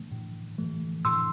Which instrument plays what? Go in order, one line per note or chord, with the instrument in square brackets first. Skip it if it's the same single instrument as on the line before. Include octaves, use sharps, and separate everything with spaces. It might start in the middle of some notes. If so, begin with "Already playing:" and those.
Already playing: [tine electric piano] A2 E3 A3
A2
E3 A3
A2 C6 E6